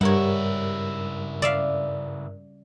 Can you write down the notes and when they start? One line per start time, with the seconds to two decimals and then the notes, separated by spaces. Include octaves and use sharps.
0.01 C#2 G2 G3 E4 A#4 C#5 F#5
1.42 C#3 D5 E5 F5